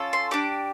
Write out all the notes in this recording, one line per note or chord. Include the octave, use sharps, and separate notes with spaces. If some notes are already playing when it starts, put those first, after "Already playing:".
Already playing: C#4 F4 A4
C6
D4 G4 D6